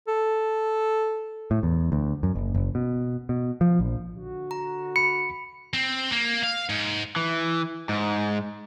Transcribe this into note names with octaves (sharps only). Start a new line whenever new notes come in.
A4
A2
E2
D2
F#2
F#1
F#1
B2
B2
F3
A#1
D3 F#4
A#5
B5 C#7
C4
A#3
F5
G#2
E3
G#2